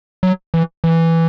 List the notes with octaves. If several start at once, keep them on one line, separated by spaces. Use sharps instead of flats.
F#3
E3
E3